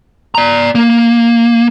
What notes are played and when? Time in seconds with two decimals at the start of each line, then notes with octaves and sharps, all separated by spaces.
0.35 D5 A#5
0.75 A#3